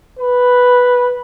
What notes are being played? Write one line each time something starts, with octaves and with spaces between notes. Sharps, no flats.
B4